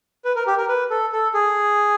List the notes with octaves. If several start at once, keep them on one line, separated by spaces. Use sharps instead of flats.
B4
A#4
G4
A#4
B4
A4
A4
G#4